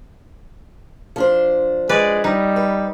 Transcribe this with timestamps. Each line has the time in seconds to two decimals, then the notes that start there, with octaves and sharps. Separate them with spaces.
1.16 F3 D4 C5
1.89 G#3 B4 D5
2.24 G3 D#4
2.56 B4